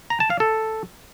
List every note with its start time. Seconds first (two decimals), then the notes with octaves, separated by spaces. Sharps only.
0.10 A#5
0.20 A5
0.30 F5
0.40 A4